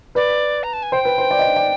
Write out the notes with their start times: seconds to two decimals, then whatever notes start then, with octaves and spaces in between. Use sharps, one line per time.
0.15 B4 D5
0.63 A#5
0.73 A5
0.82 G#5
0.92 C5 G5
1.05 B4
1.18 C5
1.31 D5
1.39 D#5
1.43 D5
1.56 D5